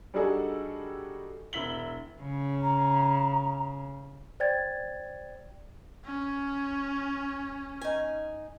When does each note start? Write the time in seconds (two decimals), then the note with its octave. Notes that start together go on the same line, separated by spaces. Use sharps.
0.14 G3 D4 D#4 F#4 G#4 A4
1.53 E1 E4 E5 B6 F#7 G7
2.22 C#3
2.62 A#5
4.40 C5 D5 G5 G#6 A6
6.05 C#4
7.81 D#4 G#5